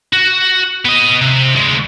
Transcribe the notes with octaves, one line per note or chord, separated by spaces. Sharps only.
F#4
B3 D#5
C3
D2 G#3